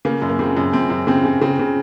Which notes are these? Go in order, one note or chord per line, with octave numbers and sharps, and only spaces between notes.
C#3 A#3
F#2
A#3
C#3 C4
F#2
F#2 C4
F#2
C#3 C4
C#3
C#3 C4
C#3